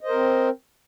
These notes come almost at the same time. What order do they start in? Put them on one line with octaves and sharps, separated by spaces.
D#5 C5 A#4 C4